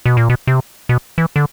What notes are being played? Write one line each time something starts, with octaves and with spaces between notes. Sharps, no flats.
B2
A#2
B2
C3
B2
E3
D3